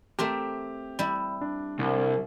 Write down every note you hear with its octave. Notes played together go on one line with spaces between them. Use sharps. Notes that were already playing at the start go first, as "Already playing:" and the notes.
A3 C4 G4 A#4
G3 E4
D4
C2